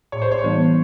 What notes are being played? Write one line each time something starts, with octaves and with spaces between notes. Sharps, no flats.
A2 C#5
C5
C#5
E3 G3 B3 D#4